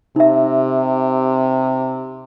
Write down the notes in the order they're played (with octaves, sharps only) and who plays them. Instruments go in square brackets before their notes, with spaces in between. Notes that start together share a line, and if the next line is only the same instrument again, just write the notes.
[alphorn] C3 [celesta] D#4 E5